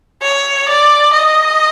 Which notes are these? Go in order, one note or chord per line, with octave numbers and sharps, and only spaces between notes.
C#5
D5
D#5